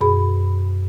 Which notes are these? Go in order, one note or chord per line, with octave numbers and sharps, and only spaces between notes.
F#2 B2 G#4 B5